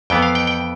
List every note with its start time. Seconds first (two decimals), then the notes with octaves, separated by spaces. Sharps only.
0.10 F2 E3 B3 G5
0.22 F5
0.35 G5
0.47 G5